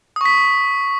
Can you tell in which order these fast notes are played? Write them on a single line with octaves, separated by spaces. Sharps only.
D#6 C#6 B6